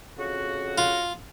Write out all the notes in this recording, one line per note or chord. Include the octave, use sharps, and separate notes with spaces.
F2 C#3 F#4
F4